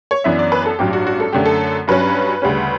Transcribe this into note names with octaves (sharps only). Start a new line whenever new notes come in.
C#5
F#2 E3 B3 D4 E5
D5
B4
A4
A1 G2 F#3 G4
F#4
F#4
A4
F#2 D3 A3 G4
A4
G2 F#3 C#4 B4
D2 C#3 G3 C#4